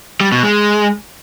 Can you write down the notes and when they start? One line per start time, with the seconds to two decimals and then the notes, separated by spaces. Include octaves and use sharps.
0.21 G3
0.32 B2
0.43 G#3